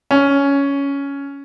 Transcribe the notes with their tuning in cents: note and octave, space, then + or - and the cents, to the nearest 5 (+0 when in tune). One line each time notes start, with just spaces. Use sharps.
C#4 +10